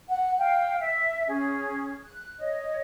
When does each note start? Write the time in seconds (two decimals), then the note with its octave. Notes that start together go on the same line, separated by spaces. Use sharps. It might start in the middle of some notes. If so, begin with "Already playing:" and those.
0.08 F#5
0.39 F5 G5
0.79 E5
1.27 C#4 G#4
2.06 F#6
2.40 C#5 D#5